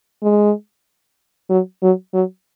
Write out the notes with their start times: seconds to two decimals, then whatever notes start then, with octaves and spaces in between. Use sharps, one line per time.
0.23 G#3
1.50 F#3
1.82 F#3
2.14 F#3